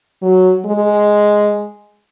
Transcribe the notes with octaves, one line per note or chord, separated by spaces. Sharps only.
F#3
G#3